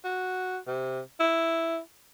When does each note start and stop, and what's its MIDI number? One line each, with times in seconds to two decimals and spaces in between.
0.04 0.58 66
0.67 1.01 48
1.20 1.78 64